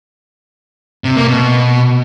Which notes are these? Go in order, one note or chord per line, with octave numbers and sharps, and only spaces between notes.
C3
A#3
B2